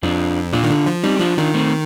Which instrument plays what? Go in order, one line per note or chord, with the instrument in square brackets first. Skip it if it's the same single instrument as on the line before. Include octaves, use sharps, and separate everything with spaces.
[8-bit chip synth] F2 [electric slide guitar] D4 F4
[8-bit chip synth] A#2 [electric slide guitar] D4 F4
[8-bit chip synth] D#3
D3
F3
[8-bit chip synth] G3 [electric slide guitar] C4 D#4
[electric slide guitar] G4
[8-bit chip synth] F3 [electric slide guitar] D4 F4
[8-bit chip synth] D#3 [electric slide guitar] D4 F4
[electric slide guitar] A3 C4